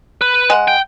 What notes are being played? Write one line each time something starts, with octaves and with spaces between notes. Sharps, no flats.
B4
G#3 F#5
G5